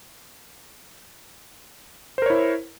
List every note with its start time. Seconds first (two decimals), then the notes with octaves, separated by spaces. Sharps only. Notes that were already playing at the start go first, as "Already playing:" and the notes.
2.18 C5
2.22 A#4
2.26 C#5
2.30 E4